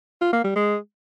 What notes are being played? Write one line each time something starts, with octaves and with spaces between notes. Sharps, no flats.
F4
A#3
G3
G#3